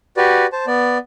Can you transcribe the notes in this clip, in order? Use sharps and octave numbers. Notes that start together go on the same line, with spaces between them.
F#4 G4 B4 D5
C5 A5
B3 D5